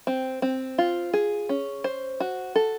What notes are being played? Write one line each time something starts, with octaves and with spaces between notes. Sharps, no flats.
C4
C4
F4
G#4
C#4
C5
F#4
A4